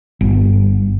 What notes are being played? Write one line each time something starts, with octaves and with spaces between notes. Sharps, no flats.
G1